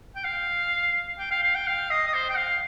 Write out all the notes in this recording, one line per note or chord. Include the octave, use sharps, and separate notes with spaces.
G5
F5
G5
F5
F5
G5
F5
D#5
D#5
C5
G5
F5